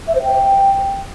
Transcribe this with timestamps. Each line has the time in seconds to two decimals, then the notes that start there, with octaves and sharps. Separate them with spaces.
0.08 E5
0.15 C5
0.23 G5